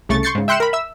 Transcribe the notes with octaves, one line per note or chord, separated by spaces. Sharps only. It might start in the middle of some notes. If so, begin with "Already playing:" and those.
C2 C#3 A3 C#6 A6
C6 C#6 G6 A6 C7 C#7
G#2 C#3
E5 G5 C6 F#6 C#7 E7
A#4 B5
E5 E6